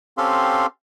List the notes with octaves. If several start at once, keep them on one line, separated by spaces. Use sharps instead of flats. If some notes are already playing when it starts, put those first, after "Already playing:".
C4 C#4 G4 A4 F5 C6